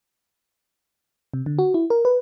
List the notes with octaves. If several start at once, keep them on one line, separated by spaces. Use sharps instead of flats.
C3
D3
F#4
E4
A#4
B4